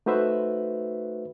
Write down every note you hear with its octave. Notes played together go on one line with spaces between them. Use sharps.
A3 D#4 F#4 B4 C5 E5